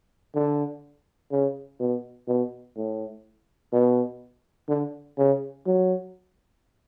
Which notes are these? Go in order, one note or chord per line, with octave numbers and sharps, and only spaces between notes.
D3
C#3
B2
B2
A2
B2
D3
C#3
F#3